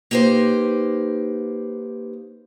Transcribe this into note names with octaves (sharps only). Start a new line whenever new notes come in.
A#3 D#4 G4 B4 C5